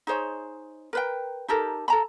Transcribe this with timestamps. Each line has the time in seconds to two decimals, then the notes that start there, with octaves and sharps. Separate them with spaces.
0.07 D#4 G#4 C5 C#5
0.93 A#4 B4 G5
1.48 D#4 G4 A4 A#4
1.88 A4 A#5 B5